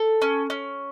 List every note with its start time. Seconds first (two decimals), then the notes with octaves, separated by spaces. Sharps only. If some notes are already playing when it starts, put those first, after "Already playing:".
Already playing: A4
0.22 C#4
0.50 C#4